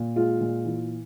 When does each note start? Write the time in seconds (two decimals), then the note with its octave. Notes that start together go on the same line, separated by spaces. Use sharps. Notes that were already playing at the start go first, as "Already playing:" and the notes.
Already playing: A#2
0.16 G#3 F4
0.41 A#2
0.65 E3